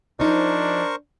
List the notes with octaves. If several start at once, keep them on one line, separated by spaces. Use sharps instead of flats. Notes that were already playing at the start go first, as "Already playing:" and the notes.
F3 D4 D#4 A#4 C5 C#6